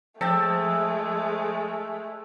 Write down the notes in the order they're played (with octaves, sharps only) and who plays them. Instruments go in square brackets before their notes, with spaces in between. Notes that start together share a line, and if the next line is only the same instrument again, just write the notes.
[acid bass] F3 [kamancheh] G#3 A3 [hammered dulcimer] E5 [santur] G5 A5